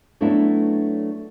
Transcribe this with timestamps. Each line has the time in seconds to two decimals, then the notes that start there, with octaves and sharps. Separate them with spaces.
0.21 F#3 A3 B3 C#4 D4 E4